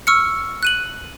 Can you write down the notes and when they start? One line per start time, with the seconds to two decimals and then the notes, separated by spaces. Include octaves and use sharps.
0.07 C#6 E6 F6 C#7
0.63 F#6 D#7 F#7